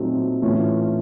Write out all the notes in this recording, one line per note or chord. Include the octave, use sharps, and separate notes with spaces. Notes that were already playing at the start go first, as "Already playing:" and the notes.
Already playing: A#2 F#3 A3 C4 D#4
A2 E3 A3 C#4 F4